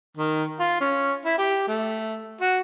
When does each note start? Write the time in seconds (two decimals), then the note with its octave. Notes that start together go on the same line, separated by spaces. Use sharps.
0.17 D#3
0.60 F4
0.80 C#4
1.25 E4
1.38 G4
1.67 A3
2.41 F#4